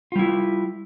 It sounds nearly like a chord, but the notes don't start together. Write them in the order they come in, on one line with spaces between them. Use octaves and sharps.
F4 G3 E4